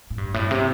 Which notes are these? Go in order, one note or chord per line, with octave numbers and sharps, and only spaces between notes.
A2
G2
A2
C3